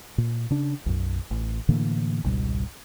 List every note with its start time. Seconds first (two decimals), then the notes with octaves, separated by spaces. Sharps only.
0.18 A#2
0.50 C#3 D4
0.86 B1 F#2
1.31 A1
1.69 A2 D3 E3 A#3
2.24 G#1 C#2 B2 G3